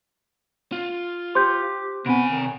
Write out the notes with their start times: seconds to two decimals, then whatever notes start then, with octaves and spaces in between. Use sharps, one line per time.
0.72 F4
1.35 G4 C5 C6 G6
2.06 C3 B3 C4 G#5 D7
2.27 D#3